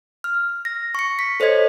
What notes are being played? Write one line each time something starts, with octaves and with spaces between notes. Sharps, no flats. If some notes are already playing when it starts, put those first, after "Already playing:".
F6
A#6
C#6 C#7
B6
A4 C5 C#5 D#5 G#6